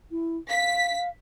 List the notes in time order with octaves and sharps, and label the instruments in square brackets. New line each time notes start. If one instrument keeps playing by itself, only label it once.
[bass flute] E4
[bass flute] F5 [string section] B6